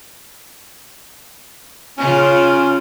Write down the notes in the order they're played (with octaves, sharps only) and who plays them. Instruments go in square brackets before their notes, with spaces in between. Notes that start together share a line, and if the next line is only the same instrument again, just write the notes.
[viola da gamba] C#3 F4 [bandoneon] C#4